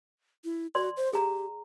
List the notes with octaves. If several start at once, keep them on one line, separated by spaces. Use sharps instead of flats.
E4
F#4 D5 C6
C5
G4 G#4 A#5